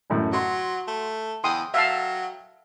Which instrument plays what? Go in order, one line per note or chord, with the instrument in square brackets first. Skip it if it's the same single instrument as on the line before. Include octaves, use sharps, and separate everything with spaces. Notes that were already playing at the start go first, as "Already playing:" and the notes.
[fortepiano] A1 F#2 A2
[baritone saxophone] F#3 [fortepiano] F#4 C6
[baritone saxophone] A3
[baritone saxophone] E2 [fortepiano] G5 [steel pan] C6 D#6
[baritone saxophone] F#3 [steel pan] E5 F5 A5